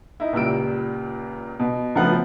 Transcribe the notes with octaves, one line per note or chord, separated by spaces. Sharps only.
D#4 E4
C#2 A#2 G3 E6 D7
B2
C#2 F3 F#3 A3 B3 F#5